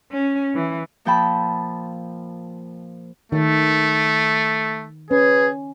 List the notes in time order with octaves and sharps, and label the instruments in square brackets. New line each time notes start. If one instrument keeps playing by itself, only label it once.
[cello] C#4
E3
[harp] A#2 F3 G5 A5 B5
[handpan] D#3 [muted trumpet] A3
[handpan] C#4 [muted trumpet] G#4 [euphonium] B4